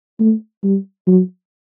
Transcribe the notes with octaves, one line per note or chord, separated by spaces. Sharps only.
A3
G3
F#3